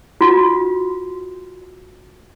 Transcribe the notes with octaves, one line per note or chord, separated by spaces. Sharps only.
F4 F#4